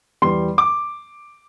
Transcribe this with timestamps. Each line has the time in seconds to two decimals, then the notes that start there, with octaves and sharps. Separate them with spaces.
0.22 E2 E3 G3 C6
0.58 D6